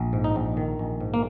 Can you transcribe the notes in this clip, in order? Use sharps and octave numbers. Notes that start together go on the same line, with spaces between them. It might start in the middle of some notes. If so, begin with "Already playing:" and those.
Already playing: A#1
G#2
D#4
A#1
D#3
A#1
G#2
A#3